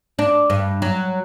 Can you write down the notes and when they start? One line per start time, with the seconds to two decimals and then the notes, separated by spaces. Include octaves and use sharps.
0.19 D4
0.50 G2
0.82 F#3